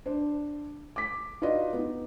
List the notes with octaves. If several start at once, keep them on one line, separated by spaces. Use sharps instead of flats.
D4 C5
D6 B6
D#4 F4 F#4 B4 D5 D#5
B3 D#4